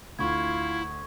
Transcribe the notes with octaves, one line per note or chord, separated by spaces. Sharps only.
D2 E4 F4 C#6 G#6